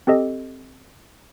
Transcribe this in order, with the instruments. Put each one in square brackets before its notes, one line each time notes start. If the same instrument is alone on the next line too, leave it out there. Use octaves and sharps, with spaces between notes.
[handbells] C4 G4 A4 D#5